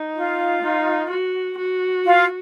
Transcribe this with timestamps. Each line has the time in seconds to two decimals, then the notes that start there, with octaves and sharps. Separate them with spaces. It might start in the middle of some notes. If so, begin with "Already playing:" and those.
Already playing: D#4
0.15 F4
0.63 D#4
1.10 F#4
1.58 F#4
2.05 F4